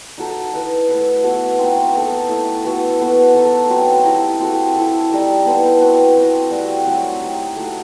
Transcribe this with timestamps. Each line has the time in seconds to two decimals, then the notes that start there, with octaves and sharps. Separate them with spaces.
0.18 D#4 F#4 A4
0.53 E4 B4 D#5
0.88 A3 E4 B4 E5
1.23 B3 F#4 A4
1.58 C4 D#4 F#4
1.93 B3 D#4 A4
2.29 A3 E4 A4 E5
2.64 B3 F#4 A4
2.99 B3 F#4 A4 E5
3.34 D#4 A4 E5
3.69 F#3 C4 D#4 F#4
4.05 E4 G4 D#5
4.40 C4 F#4 A4
4.75 E4 A4 E5
5.10 G3 D#4 A4 D#5
5.45 B3 E4 A4 C5
5.81 C4 F#4 B4
6.16 C4 F#4 C5 D#5
6.51 G3 C4 F#4
6.86 F#3 A3 C4
7.21 D#4 G4 D#5
7.56 A3 D#4 F#4